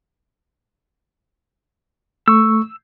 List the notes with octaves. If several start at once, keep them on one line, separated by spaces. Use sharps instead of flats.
A3 C#6 E6